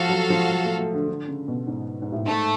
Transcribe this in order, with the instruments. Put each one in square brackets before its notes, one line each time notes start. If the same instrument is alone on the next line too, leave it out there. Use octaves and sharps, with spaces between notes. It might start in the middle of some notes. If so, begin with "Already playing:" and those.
Already playing: [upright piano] F3 [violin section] F#4 A4 F5
[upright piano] F#3
F3
F#3
A3
A3
D3
D3
C#3
B2
G#2
G#2
A2
[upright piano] G#2 [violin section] A3